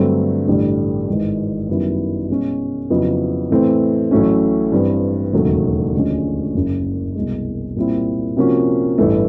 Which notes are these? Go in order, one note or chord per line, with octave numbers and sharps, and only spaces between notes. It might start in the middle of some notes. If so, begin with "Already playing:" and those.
Already playing: G2 D3 F#3 A3 C4
A1 G2 D3 G3
G#1 G#2 E3 G#3
F#2 D#3 G3 B3 E4
B2 G#3 C#4
F2 C#3 F#3 B3 E4
A2 E3 A3 C4
A1 A2 F#3 A3 C#4
G2 E3 G3 C4
E1 D#2 C#3 F#3 A3
D2 D3 F3 G#3 C#4
F#1 F#2 C#3 F#3
C2 B2 G#3
A#2 G3 C4 E4
C3 F3 A#3 C#4 F#4
A1 G2 E3 A3